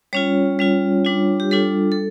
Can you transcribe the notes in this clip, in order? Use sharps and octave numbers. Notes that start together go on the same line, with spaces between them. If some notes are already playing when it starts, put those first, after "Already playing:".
G3 C#4 F4 C#5
G3 C#4 F4
G3 D4 F4
G4
G3 D4 F4 A4
A4